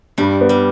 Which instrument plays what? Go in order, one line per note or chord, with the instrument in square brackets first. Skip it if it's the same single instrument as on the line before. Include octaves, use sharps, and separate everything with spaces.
[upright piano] G2 [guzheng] G3
[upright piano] B3
[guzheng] G3